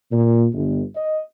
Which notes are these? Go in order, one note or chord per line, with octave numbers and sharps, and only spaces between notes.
A#2
G1
D#5